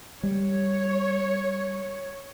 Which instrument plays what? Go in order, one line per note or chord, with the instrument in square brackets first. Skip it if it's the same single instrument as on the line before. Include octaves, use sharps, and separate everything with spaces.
[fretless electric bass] G3 [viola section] C#5